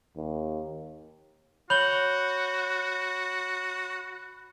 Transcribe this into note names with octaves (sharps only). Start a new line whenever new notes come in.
D#2
F#4 C#5 B5 G6 F#7 G7